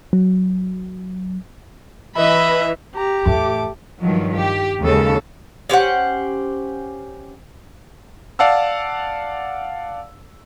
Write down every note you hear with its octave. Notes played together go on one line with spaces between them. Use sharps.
F#3
E3 B4 D#5 E5 B5
G4 A#5
E2 A2 A3 D6
G2 D#3 F3 F#3
G4
D#2 C#3 G#3 A4
C#4 G4 C5 F#5
D5 F5 F#5 A5 E6